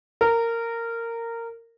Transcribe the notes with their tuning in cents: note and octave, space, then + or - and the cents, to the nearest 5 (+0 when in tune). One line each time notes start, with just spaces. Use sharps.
A#4 -15